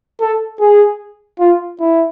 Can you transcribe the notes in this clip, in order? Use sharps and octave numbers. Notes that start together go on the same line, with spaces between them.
A4
G#4
F4
E4